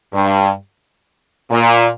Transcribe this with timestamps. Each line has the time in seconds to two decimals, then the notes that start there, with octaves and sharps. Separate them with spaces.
0.13 G2
1.50 A#2